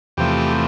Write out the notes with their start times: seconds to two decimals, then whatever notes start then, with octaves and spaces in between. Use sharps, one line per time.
0.17 E2 C3 F3 A3 G4